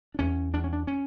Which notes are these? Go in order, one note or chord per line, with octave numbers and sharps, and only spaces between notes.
D4
E2 C#4
E2 D4
C#4
D4
C#4